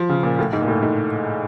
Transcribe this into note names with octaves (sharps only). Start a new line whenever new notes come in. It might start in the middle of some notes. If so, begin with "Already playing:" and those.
Already playing: F3
C#3
A#2
A2
G#2
A#2
A2
G#2